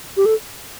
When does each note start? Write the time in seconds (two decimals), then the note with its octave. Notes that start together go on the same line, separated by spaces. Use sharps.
0.17 G4
0.25 A4